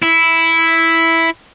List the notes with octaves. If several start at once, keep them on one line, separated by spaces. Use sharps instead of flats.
E4